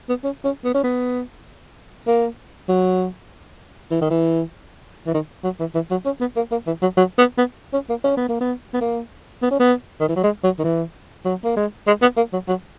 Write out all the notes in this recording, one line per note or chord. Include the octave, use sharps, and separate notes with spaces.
B3
C#4
C#4
B3
C#4
B3
A#3
F#3
E3
D#3
E3
E3
D#3
F#3
E3
E3
F#3
C#4
B3
A#3
A#3
E3
F#3
F#3
B3
B3
C#4
A#3
C#4
B3
A#3
B3
B3
A#3
B3
C#4
B3
D#3
E3
F#3
G#3
F#3
D#3
E3
F#3
A#3
G#3
G#3
B3
A#3
F#3
F#3